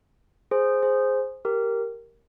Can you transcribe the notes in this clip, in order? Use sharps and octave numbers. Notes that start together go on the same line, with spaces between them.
G#4 C5
G#4 C5
G4 A#4